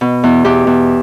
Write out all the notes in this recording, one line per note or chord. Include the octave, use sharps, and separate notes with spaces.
B2
E2
E2 G4
E2